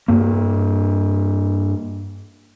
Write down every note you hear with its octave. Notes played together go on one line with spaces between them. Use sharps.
G2 A#3